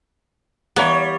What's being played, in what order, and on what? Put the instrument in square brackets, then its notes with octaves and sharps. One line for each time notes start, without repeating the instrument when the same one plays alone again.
[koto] E3 A#3 B3 [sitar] G3 C#5